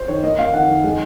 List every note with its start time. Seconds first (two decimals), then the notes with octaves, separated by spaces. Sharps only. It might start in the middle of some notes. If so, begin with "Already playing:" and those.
Already playing: C5
0.08 D#3 C#5
0.23 A#3 D#5
0.38 A#3 F5
0.53 D#3 F#5
0.69 D#3
0.84 G#3